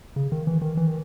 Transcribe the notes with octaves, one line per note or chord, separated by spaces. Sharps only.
C#3
D#3
E3
D#3
E3
D#3